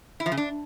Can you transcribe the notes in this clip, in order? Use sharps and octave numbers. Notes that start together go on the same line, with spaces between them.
E4
F3
C#3
D4